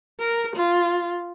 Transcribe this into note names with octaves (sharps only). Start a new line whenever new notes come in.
A#4
F4